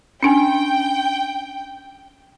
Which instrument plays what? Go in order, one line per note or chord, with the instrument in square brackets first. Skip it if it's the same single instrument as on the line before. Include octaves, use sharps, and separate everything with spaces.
[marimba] C#4 D4 G#5 [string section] G5